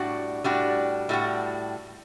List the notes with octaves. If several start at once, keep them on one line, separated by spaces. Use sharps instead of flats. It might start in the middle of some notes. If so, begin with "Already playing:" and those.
Already playing: A2 G3 D4 F#4
A2 G3 D4 F#4
A2 G3 D4 F#4